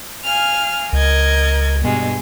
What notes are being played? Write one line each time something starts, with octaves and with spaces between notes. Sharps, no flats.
F5 G#5 F6
C#2 A#4 D#5 G#6
G2 B2 G#3